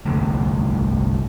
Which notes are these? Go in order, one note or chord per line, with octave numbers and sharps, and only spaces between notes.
G1 C2 D3 A3